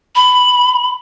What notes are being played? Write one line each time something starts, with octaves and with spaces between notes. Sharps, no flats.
B5